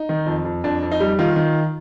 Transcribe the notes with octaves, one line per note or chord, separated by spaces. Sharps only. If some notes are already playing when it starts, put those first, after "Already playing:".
Already playing: D#4
D#3
F2
F2
F2 D4
F2
D#4
G3
D#3 F4
D#3